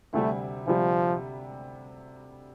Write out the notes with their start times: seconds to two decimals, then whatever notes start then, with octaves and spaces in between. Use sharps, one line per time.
0.14 D2 C3 G3 A3
0.67 D2 C3 F3 G3